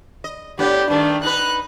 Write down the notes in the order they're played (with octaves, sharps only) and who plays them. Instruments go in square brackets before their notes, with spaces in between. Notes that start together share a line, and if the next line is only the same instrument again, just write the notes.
[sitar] D#5
[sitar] A2 B3 D4 [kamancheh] G4
[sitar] G2 D#3 A3 [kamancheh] D4
[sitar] D#4 B4 [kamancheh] F#6